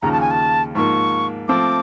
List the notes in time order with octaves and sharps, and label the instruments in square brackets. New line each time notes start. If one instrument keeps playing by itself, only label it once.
[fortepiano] D#2 C#3 F3 [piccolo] A#5
[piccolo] A5
G#5
A5
[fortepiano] G#2 F3 A#3 [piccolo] C#6
[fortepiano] F3 A3 C4 [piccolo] D6